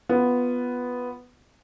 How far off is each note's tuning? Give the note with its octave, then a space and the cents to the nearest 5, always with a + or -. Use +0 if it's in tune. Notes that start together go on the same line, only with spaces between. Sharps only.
B3 +0 F4 -5